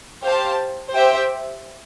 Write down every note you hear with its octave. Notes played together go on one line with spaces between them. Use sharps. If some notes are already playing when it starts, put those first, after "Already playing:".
G4 C5 F5 A5
G4 C5 E5 G5